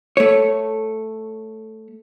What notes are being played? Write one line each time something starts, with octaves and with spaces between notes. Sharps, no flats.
A3 C#5